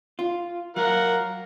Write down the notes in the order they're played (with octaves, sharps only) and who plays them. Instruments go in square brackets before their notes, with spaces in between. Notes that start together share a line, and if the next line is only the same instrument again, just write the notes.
[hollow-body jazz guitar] F4
[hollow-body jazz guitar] F#3 [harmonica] A#4 F5 F#5